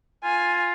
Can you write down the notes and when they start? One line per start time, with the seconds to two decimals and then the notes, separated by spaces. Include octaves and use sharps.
0.24 F4 G#5